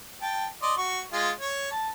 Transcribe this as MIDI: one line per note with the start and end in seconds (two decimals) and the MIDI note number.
0.22 0.46 79
0.22 0.46 81
0.62 0.73 74
0.62 0.73 75
0.62 0.73 84
0.77 1.01 66
0.77 1.01 85
1.13 1.30 56
1.13 1.30 65
1.40 1.68 73
1.71 1.89 81